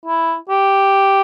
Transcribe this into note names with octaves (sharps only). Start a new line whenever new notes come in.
E4
G4